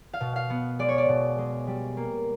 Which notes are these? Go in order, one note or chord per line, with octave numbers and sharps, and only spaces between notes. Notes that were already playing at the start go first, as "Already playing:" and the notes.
F5
B2
F5
B3
G#3 D5
C#5
D5
B2
G#3
G3
A#3